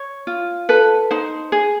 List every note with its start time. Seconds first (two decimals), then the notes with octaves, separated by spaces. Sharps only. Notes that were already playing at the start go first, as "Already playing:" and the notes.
Already playing: C#5
0.27 F4
0.69 A4 B4
1.11 D#4 C5
1.52 G#4